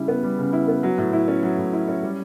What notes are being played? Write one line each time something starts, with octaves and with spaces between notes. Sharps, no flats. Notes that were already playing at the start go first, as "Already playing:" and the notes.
Already playing: C#3 G3 E4
B3
G3
C#3
E4
B3
F#3
A2
E4
C#4
F#3
A2
E4
C#4
G3